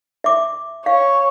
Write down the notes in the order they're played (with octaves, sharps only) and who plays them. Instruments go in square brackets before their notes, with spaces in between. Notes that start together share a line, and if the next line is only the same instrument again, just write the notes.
[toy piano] E5 D6
[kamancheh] C#5 [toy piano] F5